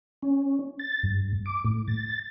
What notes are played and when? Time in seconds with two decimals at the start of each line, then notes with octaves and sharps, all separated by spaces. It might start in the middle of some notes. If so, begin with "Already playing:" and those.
0.23 C#4
0.79 A6
1.03 G2
1.46 D6
1.65 A2
1.88 A6